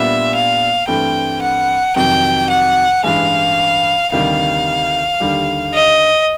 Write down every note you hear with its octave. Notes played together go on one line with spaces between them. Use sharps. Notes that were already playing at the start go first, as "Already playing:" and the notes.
Already playing: A#2 G3 B3 D4 F4 E5
F5
G2 E3 A3 C4 G5
F#5
F2 C3 D#3 F#3 G5
F#5
A1 G2 E3 G#3 F5
D2 C3 D#3 G3 F5
D#2 D3 G3
D#5